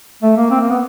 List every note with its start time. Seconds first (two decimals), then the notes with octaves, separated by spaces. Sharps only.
0.23 A3
0.37 A#3
0.51 C4
0.61 A#3
0.70 B3